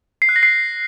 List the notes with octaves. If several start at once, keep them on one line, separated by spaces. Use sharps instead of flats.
C7
F#6
A#6
C7